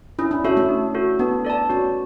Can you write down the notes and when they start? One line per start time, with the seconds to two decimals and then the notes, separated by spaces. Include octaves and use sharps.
0.19 C#4 E4
0.31 D4
0.44 C#4 F#4 A4 E5
0.57 A3
0.69 D4
0.95 F#4 A4
1.19 B3 D4
1.45 A4 D5 A5
1.69 C#4 F#4